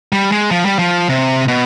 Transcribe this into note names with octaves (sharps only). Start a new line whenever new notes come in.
G3
G#3
F3
G3
F3
C3
B2